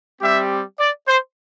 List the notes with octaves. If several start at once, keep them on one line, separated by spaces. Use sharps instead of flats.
G3 C4 G4 E5
D5
C5